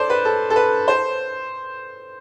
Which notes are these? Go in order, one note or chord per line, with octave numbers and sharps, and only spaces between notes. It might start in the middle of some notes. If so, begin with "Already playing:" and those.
Already playing: A4 C5 D5
B4
A4
A4
B4
C5